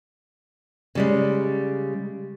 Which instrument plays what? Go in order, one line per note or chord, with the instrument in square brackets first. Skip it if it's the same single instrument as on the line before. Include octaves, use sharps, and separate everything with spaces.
[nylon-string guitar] C#3 G3 G#3